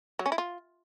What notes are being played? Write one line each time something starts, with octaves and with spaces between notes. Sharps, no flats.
F#3
C#4
E4
F4